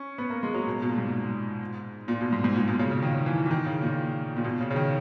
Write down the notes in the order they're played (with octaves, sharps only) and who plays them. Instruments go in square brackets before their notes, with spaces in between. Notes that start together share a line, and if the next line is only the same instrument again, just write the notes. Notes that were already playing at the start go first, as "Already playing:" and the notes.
Already playing: [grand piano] C#4
B3
A#3
G#3
F#3
B2
B2
A#2
G#2
A#2
B2
G#2
G#2
A#2
B2
C#3
C#3
D#3
E3
E3
D#3
C#3
A#2
A#2
B2
C#3
C#3
D#3